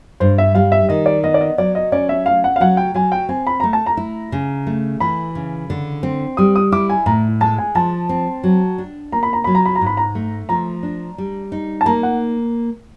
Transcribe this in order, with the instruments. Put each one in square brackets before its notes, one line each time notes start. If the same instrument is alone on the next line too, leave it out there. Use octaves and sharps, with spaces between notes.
[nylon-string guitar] G2 [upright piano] C5
[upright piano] E5
[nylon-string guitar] G3 [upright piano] F5
[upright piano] E5
[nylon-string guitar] D#3 [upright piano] D#5
[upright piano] D5
[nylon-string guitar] B3 [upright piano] D#5
[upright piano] D5
D#5
[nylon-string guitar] F#3 [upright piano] D5
[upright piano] D#5
[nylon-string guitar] C#4 [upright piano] D5
[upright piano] E5
[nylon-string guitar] A3 [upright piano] F5
[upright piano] F#5
F5
[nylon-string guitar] F#3 [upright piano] F#5
[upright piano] G5
[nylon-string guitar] F#3 [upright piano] G#5
[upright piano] G5
[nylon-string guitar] C4 [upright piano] G#5
[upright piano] B5
[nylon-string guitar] A3 [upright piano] A#5
[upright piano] A5
A#5
[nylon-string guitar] E4
C#3
A3
[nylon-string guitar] E3 [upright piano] B5
[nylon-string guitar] C#3
D3
C4
[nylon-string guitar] G3 [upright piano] D#6
[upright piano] D#6
[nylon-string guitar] E4 [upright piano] D6
[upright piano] G#5
[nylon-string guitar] A2 [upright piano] A#5
[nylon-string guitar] G#3 [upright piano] A5
[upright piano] G#5
[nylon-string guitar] F3 [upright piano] A5
[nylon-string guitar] C4
F#3
D4
[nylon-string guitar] A#3 [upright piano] A#5
[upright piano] B5
A#5
[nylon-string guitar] F#3 [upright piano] B5
[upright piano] A#5
B5
A#5
[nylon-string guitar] G#2
[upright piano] B5
A#5
[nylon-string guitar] A3
[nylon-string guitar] F3 [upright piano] A#5
[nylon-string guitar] D4
G3
D#4
[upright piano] A5
[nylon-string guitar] A#3 [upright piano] A#5
[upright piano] F#5